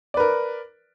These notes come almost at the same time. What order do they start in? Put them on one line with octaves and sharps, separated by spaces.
D5 B4 A#4